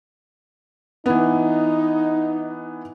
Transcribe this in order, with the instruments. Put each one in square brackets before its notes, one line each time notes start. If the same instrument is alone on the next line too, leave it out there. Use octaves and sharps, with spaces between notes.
[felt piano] E3 B3 [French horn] D#4